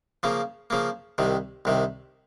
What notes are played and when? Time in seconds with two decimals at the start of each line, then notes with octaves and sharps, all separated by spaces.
0.23 C#3 F3 A#3
0.70 C#3 F3 A#3
1.18 C2 C3 D#3
1.65 C2 C3 D#3